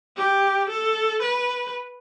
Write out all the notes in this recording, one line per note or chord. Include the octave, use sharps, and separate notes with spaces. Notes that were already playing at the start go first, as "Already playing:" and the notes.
G4
A4
B4